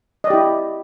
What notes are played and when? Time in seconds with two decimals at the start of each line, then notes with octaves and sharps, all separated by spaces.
0.24 D#5
0.27 D5
0.30 G4
0.33 E4